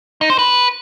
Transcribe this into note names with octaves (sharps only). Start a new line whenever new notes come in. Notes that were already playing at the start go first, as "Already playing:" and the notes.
D#4
C5
B4